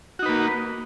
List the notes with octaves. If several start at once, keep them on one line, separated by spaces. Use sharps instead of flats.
A#3 D#4 F#4 B4